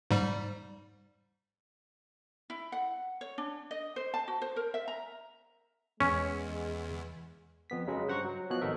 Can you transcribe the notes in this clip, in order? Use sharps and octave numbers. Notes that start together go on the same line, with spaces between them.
G#2 G3
E4
F#5
C#5
D4
D#5
C5
A5
F#4
C5
A#4
E5
A#5
E2 G#3 C#4
F2 B3 B6
C#3 F#3 G#3
G2 C5 F#5 A#5 C#6
F#3
B2 F3 F#4 C#5 F#6
G#1 A3 B3 D#4 A#4 E5